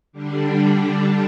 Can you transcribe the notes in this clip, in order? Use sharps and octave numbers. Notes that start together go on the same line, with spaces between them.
D3 G3 D4